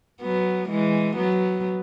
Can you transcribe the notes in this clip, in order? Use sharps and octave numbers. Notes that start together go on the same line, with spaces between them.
F#3 B3
E3 G#3
F#3 B3